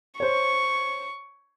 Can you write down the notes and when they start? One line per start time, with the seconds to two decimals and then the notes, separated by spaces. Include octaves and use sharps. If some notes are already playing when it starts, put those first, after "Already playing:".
0.20 C5 C#5 C#6